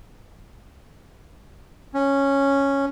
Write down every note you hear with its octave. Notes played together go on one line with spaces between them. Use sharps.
C#4